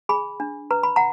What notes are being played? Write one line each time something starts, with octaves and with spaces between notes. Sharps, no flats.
G#4 G#5 B5
D4
B4 A#5
B5
F#5 A#5